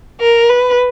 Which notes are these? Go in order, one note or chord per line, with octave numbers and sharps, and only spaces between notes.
A#4
B4